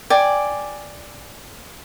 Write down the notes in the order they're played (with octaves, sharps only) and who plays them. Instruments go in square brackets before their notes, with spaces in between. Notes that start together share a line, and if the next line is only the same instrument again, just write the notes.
[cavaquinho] D5 G5 G#5